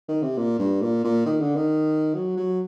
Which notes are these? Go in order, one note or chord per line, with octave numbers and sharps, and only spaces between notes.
D#3
C3
A#2
G2
A#2
A#2
D#3
D3
D#3
F#3
F#3